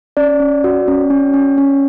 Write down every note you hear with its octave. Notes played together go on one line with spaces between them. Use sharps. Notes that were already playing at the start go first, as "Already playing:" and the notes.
C#4 D5
C#4
F#4
C#4
C#4
C#4
C#4